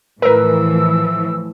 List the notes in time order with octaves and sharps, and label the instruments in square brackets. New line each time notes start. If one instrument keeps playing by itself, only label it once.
[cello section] A2 E3 F3 [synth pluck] A#4 B4 [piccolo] E6